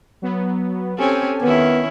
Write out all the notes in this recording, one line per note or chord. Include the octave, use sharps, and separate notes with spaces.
F#3 B3
C4 C#4 G4 A4 G#5
D#3 B3 C#4 E4